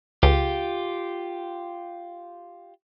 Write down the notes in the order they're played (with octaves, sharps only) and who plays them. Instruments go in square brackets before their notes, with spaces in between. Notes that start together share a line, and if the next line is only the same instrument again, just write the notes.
[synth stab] C#2 [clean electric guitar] F4 G4